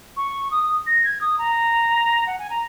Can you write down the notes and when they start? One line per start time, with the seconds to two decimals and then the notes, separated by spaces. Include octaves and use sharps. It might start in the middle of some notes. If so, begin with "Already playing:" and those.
0.16 C#6
0.51 D#6
0.64 D#6
0.86 A#6
1.04 G#6
1.21 D#6
1.38 A#5
2.27 F#5
2.38 G#5
2.50 A#5